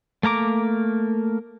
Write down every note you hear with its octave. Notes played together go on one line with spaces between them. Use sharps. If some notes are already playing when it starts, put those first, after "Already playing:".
A3 A#3 A#5 D6